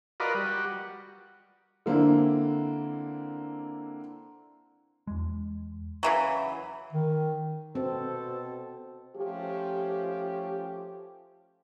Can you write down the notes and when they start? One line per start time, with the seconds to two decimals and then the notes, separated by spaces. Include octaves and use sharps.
0.20 F4 F#4 A#4 B4 D5 D#5
0.34 G3 F#4
1.86 D3 A#3 C4 D4 E4
5.07 E2 G#3
6.03 C#3 E3 F#3
6.93 D#3
7.75 B2 C4 A4
9.17 F3 A3 C#4 G4